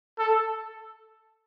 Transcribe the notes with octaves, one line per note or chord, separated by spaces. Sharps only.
A4